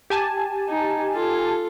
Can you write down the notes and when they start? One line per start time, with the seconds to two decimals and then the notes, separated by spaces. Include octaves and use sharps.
0.10 G4 G#5 A5
0.69 D#4
1.13 F4 A4